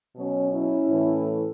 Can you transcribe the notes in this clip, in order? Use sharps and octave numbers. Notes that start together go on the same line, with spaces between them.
B2 F#3 C#4
C#4 E4
A2 E3 A3